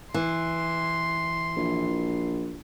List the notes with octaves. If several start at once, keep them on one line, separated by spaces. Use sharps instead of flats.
E3 C6
A#1